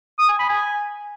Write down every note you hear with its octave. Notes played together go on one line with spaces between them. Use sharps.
D#6
G#5
B5
G#5